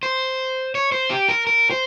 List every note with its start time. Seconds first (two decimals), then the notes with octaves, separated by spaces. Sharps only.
0.03 C5
0.75 C#5
0.92 C5
1.10 G4
1.29 A#4
1.47 A#4
1.70 C5